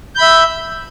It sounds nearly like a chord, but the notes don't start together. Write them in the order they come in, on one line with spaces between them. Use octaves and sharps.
G6 B5 E5